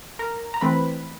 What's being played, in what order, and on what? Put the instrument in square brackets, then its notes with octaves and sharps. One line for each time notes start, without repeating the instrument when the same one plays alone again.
[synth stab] A#4 A#5
A#5
E3 A3 C4 B4 B5